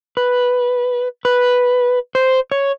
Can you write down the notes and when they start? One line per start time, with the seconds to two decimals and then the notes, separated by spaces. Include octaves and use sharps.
0.17 B4
1.25 B4
2.15 C5
2.52 C#5